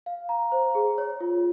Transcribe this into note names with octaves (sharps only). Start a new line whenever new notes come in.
F5
A#5
C5
G#4
C#5
F4